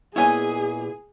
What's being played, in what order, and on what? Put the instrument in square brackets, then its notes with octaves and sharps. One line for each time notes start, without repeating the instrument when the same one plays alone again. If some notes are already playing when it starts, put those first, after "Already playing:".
[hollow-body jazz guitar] A#2 B3 E4 [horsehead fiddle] G#4 [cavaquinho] C#5 D#5 G#5